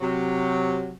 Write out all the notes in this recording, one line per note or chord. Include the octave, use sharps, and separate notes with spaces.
C3 F#3